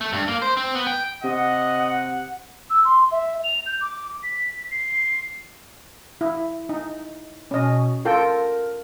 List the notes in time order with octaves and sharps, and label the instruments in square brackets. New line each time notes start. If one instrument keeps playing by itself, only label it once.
[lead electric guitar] A3
G2
A#3
C5
C4
B3
G5
[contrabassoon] C3 [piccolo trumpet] D#5 [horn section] F#5
[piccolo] E6
C6
E5
F7
G6
D6
B6
C7
[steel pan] E4
D#4
[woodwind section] B2 [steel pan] C#4 D#5
[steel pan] F4 A4 G5 [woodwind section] A#4